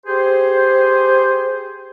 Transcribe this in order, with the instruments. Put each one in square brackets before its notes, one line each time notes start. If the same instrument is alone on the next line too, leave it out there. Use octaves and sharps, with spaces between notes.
[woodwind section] G4 G#4 C5